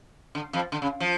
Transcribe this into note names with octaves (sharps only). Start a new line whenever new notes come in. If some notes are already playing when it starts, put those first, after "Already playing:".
D3
F2 F3
D3
C#3
F3